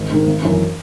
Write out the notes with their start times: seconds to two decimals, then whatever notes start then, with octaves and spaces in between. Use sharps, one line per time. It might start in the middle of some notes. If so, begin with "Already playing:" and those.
Already playing: G#1
0.10 G#2 D#3
0.27 G#1
0.43 F#2 E3